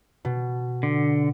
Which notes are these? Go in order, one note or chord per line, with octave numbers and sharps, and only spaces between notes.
B2
D3